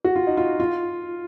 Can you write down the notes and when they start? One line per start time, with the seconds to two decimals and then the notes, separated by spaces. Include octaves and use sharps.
0.04 F#4
0.16 F4
0.27 D#4
0.37 F4
0.60 F4